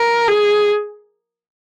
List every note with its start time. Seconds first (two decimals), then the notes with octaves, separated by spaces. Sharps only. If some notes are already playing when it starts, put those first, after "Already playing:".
Already playing: A#4
0.28 G#4